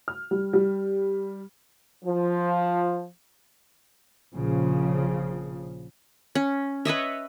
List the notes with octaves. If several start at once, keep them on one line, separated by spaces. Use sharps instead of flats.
F6
G3
G3
F3
A#1 C#3 F3
C#4
B4 C#5 D#5 E5